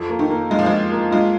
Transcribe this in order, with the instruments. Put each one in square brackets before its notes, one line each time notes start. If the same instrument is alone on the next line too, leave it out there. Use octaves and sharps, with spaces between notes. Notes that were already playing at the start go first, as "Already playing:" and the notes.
Already playing: [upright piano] F2
A#3
[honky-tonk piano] D#3
[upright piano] A#3
[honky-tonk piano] G#3 [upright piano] F4
[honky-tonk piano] F3
[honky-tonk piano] G#3 [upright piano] F4
[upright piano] A#3
[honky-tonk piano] G#3 [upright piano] F4